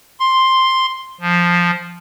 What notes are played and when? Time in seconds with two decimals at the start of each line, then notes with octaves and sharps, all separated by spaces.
0.20 C6
1.21 F3